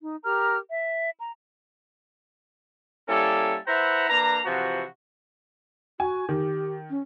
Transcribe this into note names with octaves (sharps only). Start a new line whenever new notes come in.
D#4
G4 A#4 A#5 F6
E5
A#5
G3 A#3 C#4 E4 A4
E4 B4 C5 E5 F#5 A#5
A#3 D4 B4 A#5
C3 E3 F3 F#4
F#4 G#5
D#3 G4
C#4